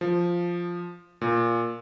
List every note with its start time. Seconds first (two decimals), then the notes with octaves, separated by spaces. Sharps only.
0.01 F3
1.21 A#2